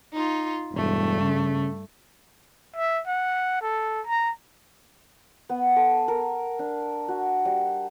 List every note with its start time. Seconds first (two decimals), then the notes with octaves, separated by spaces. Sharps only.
0.14 D#4 F4
0.72 E1 G2 A3
1.21 C#3
2.76 E5
3.07 F#5
3.62 A4
4.07 A#5
5.49 B3
5.76 A4
6.08 A#4
6.59 D4
7.08 F#4
7.45 G3